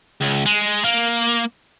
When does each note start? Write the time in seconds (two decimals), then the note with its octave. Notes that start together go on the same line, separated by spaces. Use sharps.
0.21 C#2
0.46 G#3
0.84 A#3